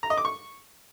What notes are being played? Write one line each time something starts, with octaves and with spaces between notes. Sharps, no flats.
A#5
D#5
D6
C#6